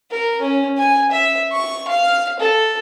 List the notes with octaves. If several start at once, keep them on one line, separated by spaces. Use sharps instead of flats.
A#4
C#4
G#5
E5
C#6
F5
A4